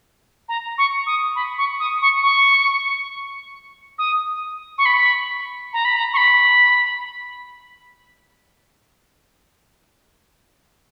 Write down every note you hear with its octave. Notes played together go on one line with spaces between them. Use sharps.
A#5
C#6
D#6
B5
C#6
D#6
C#6
C#6
D#6
C#6
B5
A#5
B5
A#5
C#6
B5